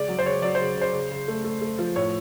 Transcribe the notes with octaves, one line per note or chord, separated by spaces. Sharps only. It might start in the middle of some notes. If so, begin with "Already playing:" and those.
Already playing: C#3 G#3 D5
F#3
C5
C#3 C#5
F#3 D5
C#3 C5
C#3 C5
C#3
C#3
A3
A3
A3
F3
A2 C#5